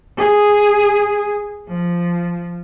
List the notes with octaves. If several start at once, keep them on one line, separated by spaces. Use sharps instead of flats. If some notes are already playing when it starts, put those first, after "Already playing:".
G#4
F3